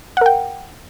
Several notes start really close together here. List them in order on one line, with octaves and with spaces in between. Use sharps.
F#5 A#4 G5